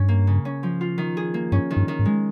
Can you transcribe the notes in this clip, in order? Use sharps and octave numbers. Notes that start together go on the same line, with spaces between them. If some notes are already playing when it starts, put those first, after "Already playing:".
Already playing: G2 C#4 C#5
A#3
C#3
C#4
F3
F4
D#3
G#4
A#3
G2 C#4
D#3
G2
D#3
G#2
G#3